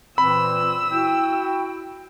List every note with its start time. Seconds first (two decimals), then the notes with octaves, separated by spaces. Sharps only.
0.18 A#2 E3 C4 B5 E6
0.91 E4 F#4 G5